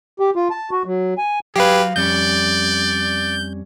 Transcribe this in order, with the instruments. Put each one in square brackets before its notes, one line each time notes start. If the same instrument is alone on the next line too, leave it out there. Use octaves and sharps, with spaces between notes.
[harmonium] G4
F4
A5
F#4
F#3
G#5
[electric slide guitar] F#3 F5 [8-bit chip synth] G4 B4 [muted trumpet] G#4
[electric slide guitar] F2 G3 C#4 [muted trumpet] D5 [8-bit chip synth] G6